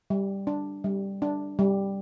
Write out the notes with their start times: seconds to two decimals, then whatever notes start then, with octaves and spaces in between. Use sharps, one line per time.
0.10 G3
0.47 D4
0.84 G3
1.22 D4
1.59 G3